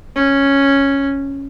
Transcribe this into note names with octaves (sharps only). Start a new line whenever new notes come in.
C#4